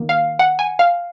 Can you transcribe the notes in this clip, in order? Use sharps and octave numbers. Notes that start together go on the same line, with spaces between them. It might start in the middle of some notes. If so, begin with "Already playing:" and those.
Already playing: D#3 A#3
F5
F#5
G#5
F5